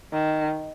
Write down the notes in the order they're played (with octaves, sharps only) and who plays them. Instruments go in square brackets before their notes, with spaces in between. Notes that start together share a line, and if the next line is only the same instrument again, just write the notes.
[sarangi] D#3